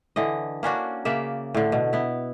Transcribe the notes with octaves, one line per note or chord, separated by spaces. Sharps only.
D3 E3 D#5
A#3 C#4 D4 F#4
C#3 A#3 D5 E5
A2 D3
B2
B3 E4